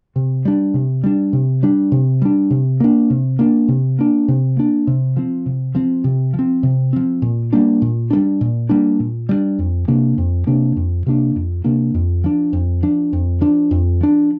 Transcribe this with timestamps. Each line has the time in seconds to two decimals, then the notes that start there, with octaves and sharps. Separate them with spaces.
0.16 C3
0.45 G3 D4
0.74 C3
1.04 G3 D4
1.33 C3
1.63 G3 D4
1.92 C3
2.22 G3 D4
2.50 C3
2.80 A#3 D4
3.10 C3
3.39 A#3 D4
3.68 C3
3.99 A#3 D4
4.28 C3
4.57 A#3 D4
4.87 C3
5.17 F3 C4
5.46 C3
5.75 F3 C4
6.04 C3
6.34 F3
6.39 C4
6.63 C3
6.93 F3 C4
7.22 A#2
7.53 G3 A#3 D4
7.82 A#2
8.10 G3 A#3 D4
8.41 A#2
8.69 G3 A#3 D4
9.00 A#2
9.29 G3 A#3 D4
9.59 F2
9.88 C3 A#3 D4
10.18 F2
10.47 C3 A#3 D4
10.76 F2
11.06 C3 A#3 D4
11.36 F2
11.64 C3 A#3 D4
11.94 F2
12.24 F3 D4
12.53 F2
12.83 F3 D4
13.13 F2
13.41 F3 D4
13.71 F2
14.01 F3 D4